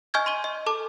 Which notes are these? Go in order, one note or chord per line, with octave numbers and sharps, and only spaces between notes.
D#5 G#5 C#6 F6 G6 G#6
C6 D#7 G7
D#5
A4 A5 D6